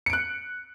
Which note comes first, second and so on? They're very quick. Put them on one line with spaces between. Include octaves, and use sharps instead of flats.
C#7 D7 F#6